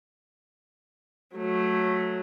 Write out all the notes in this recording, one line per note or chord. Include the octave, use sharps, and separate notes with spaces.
F#3 A3